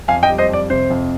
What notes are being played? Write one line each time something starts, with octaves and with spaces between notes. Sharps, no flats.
F2 F5 G#5
D#5 G5
G3
C5 D#5
F2 D5
C3 C5
F2